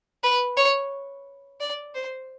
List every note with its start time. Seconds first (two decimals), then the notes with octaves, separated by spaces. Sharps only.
0.23 B4
0.57 C#5
1.60 D5
1.95 C5